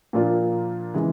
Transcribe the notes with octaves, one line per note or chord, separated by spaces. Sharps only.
A#2 F3 A#3 D4 F4
C#3 E3 G#3